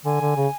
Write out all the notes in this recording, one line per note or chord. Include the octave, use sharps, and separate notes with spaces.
D3 G#5
D3
C#3